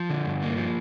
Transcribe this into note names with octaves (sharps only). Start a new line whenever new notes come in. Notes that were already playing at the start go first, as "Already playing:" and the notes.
Already playing: F3
D3
G2
A#3
F3